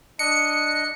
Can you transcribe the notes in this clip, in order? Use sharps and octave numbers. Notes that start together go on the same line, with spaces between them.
D4 D#5 C#7